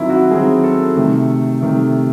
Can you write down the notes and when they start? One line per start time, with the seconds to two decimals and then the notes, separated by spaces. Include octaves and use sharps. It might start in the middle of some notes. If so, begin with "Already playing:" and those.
Already playing: D#3 F#3 C4 E4
0.10 F#4
0.31 D#3 F#3 C4 G#4
0.64 A4
0.96 C3 D#3 A3
1.61 C3 D#3 A3